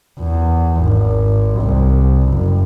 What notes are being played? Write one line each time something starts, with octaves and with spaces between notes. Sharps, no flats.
E2
G#1
C2
F#1